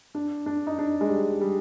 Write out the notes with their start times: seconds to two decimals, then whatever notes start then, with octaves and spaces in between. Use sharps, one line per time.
0.15 D4
0.46 D4
0.67 D#4
0.78 D4
1.01 G#3
1.09 G3
1.41 G3